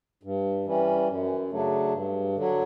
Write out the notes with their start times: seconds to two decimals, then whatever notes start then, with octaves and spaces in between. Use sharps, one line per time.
0.23 G2
0.65 E3 G3 C#4
1.08 F#2
1.51 C#3 F#3 A3 D4
1.93 G2
2.36 D3 F#3